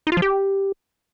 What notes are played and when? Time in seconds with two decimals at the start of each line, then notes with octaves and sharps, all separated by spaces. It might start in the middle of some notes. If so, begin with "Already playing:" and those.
0.07 D#4
0.12 F4
0.17 F3
0.22 G4